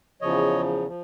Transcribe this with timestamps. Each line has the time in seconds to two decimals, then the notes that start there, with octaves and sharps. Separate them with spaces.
0.21 E2 C#3 F3 C#5 D#5
0.88 F3